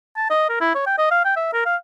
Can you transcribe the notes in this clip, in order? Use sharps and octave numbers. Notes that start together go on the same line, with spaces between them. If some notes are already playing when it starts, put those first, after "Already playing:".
A5
D#5
A#4
E4
C#5
G5
D#5
F5
G5
E5
A#4
F5